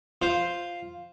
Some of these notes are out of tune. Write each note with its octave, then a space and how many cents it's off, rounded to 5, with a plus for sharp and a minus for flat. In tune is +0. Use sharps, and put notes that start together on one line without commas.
F4 +0 C5 +0